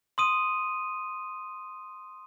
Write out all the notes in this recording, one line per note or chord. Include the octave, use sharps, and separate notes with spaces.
C6 D#6 D#7